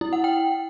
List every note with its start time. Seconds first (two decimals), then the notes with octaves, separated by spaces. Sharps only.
0.01 E4
0.13 F#5
0.24 G5